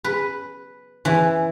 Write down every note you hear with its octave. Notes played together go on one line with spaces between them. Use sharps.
B4
E3